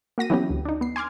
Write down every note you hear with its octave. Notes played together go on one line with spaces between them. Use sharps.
A#3 F#4 A#6 D#7
E3 F#3 B3 C#4 G4
D2
D4 D#4
B3 C7
G#5 C6 D6 F6 G#6